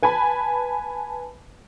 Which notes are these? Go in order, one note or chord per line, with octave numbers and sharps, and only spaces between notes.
B4 G#5 A5 B5